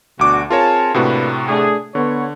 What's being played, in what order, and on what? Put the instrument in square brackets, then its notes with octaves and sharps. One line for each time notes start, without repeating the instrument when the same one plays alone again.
[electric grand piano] D2 D6 [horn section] B2 D4 F#4
[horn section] C4 G#4 A5 [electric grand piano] F4 A#4 C#5
[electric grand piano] A2 C3 F#4 [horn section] A#3 D4 B4
[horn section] A3 D4 G#4
[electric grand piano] D3 [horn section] B3 C#5